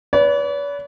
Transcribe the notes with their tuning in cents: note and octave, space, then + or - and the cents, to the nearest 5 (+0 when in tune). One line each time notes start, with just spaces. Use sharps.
B4 +0 D5 -45